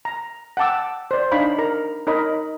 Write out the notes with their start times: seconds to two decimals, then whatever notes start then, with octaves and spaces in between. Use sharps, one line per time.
0.05 A#5
0.57 F#5 G5 A5 D6 E6
1.11 C5 D5
1.31 D4 D#4 C#5 F5 B5
1.58 A#4 A#5
2.07 D#4 A#4 C#5 D#5 B5